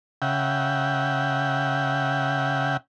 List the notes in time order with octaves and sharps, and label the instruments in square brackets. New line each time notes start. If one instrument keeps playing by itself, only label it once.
[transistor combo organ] C#3 E5 F#5 G5